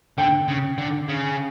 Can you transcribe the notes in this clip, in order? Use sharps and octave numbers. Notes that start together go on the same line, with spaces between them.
D3 G5
C#3
D3
C#3